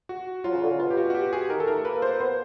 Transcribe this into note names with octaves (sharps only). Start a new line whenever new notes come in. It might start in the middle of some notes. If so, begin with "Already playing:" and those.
F#4
F#3 F4
C#3
D3
C#3
B2 F4
G4
F#4
F#4
G4
G#4
D#3 A#4
A4
A3 A#4
A#3 B4
C5
B3 C5